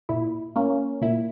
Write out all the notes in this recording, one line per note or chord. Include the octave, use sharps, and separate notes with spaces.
A#2 E4
A#3 C#4
A#2 E4